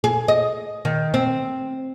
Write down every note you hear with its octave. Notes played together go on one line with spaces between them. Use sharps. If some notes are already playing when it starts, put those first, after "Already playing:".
G#4
D#5
D#3
C4